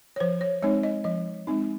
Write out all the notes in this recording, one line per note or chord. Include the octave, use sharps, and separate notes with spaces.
C#5
F3 C5
C#5
G#3 C4 D#4 C#5
D#5
F3 D#5
G#3 C4 D#4